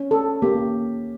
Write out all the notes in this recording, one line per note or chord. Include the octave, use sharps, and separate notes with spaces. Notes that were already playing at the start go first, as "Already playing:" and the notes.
Already playing: C#4
A4
A#3 G4